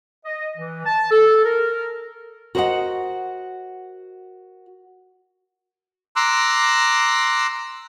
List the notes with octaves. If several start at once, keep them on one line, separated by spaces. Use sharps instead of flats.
D#5
E3
A5
A4
A#4
F#4 A#4 C5 D5 D#5 F#5
A#5 C6 D6 E6 F#6